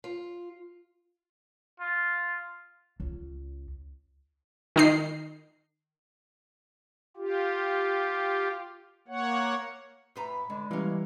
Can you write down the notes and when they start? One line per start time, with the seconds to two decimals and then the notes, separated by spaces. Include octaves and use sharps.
0.04 F4
1.80 F4
3.00 C#2
4.76 D#3 D#4 C7
7.17 F4 G4
9.08 A#3 C#5 F#5
10.16 A2 B4 A#5
10.50 D3 G#3
10.71 E3 G3 A#3 C#4